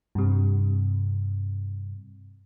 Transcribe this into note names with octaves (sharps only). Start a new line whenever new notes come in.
G2 C3